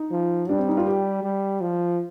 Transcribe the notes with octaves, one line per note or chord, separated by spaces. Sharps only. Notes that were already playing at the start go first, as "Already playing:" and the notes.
Already playing: D#4
F3
G3 D4
C4
D#4
F4
G4
G3
F3